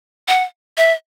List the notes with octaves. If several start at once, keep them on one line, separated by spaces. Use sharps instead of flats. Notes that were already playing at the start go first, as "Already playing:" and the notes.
F#5
E5